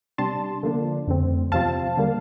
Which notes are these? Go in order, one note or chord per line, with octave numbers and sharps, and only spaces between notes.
C3 G3 D4 A5 C6
D3 F3 A#3 D4
F2 D3 A3 C4
E2 C3 F3 C4 F5 A5
D3 G3 A#3